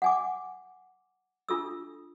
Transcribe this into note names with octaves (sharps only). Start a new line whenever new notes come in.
F#5 G#5 D6
D4 F4 A4 E6